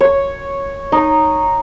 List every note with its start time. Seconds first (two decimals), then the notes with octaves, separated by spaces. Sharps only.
0.01 C#5
0.92 D#4